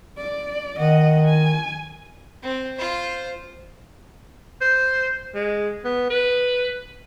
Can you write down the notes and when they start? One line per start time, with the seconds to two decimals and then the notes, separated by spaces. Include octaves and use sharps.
0.18 D5
0.79 D#3 D#5 F#5
1.25 G#5
2.43 C4
2.77 F4 C5
4.61 C5
5.35 G#3
5.84 B3
6.10 B4